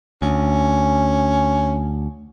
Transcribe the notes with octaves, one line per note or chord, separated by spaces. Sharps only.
D2 C#4